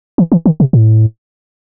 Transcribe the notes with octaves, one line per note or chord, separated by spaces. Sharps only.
E3
E3
D#3
C3
A2